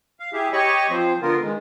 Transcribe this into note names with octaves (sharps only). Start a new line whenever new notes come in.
F5
E4 G4 G#4 E5
G4 C#5 D#5 B5 C#6
F3 C4 C5
D3 B3 F4 A#4
D#3 G#3